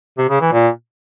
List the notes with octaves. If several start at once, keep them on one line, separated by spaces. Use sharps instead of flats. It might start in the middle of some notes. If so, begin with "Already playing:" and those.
C3
C#3
E3
A#2